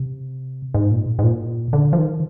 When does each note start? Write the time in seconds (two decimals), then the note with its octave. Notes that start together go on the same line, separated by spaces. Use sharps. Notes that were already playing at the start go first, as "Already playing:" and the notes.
Already playing: C3
0.74 G#2
0.91 A#2
1.19 G#2
1.24 A#2
1.73 D3
1.93 F3
1.98 D#3